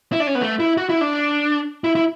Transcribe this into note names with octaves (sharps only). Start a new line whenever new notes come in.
E4
D4
C#4
B3
A3
E4
F#4
E4
D4
E4
E4